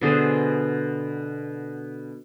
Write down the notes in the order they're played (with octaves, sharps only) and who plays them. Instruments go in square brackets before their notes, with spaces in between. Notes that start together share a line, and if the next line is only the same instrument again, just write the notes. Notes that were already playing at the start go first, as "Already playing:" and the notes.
[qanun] B2 D3 G#4 C5